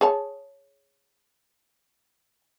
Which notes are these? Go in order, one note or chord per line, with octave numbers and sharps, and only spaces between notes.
G#4 C#5 A5